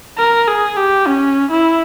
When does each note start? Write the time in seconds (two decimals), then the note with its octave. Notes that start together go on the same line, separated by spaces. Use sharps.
0.18 A#4
0.47 G#4
0.77 G4
1.07 C#4
1.51 E4